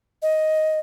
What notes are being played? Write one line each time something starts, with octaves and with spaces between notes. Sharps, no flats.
D#5